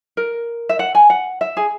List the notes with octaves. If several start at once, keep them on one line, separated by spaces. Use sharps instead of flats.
A#4
E5
F#5
G#5
F#5
E5
G#4